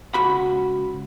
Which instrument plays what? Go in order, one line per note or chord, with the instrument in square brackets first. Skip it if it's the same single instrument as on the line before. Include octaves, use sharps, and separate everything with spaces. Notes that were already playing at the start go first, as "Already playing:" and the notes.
[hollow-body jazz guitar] C#2 F#4 B5